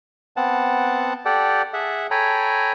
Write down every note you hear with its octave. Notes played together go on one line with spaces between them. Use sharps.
B3 C4 F#5 A5
G4 A4 D5 F#5 G5
G#4 E5 F#5
A4 C#5 G5 G#5 A#5 B5